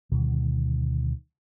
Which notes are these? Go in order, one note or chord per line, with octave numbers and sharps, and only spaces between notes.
D2 B2 D#3 G3